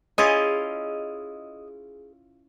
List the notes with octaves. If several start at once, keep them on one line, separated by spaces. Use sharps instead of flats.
C#4 E4 F4 G#4 D#5